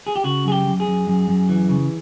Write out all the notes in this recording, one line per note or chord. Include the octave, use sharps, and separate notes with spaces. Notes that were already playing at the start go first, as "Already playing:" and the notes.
G#4
G4
C#3 F#4
F#2 G#4
G4
F#2
G#4
F#2
F#2
F#2
E3
C#3